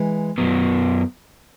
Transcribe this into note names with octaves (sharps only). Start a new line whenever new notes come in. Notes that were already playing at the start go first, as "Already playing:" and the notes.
Already playing: E3 G#3
F#2 F#3 B3